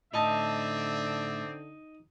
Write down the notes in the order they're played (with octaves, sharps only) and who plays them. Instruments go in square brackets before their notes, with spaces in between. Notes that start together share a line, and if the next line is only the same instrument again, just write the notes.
[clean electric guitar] A2 A5 [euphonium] D3 [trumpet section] C4 D5 E5 [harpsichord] D#4